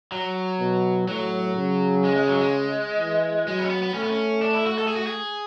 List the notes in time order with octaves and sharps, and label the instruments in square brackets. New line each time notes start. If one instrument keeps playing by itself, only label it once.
[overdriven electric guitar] F#3
[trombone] B2
[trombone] A2 [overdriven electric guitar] F#3
[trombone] C#3
[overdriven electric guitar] G#3
G#3
F#3
G#3
[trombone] E3
[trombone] F#3 [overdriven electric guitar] G#3
[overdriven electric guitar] B3
C#4
B3
B3
[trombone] A3 [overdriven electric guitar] C#4
[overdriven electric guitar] B3
C#4
D4
E4
F#4
A4
G#4
F#4
G#4